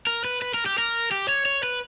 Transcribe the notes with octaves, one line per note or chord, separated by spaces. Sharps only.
A#4
B4
B4
A#4
G4
A#4
G4
C#5
C#5
B4